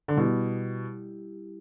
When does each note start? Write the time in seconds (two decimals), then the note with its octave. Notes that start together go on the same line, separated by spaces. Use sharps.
0.08 D3
0.17 B2 G3 E4 G4